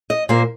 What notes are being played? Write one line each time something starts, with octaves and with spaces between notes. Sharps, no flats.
D#5
A#2 A#3 C5